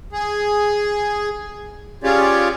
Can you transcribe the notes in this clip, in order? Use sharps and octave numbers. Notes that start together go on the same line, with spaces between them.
G#4
C#4 F4 G4 G#4 C#5 D5